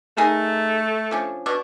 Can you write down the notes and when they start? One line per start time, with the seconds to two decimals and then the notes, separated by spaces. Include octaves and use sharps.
0.17 A3 D#4 G#4 A#4
1.11 F3 C#4 D4
1.46 B2 D4 C#6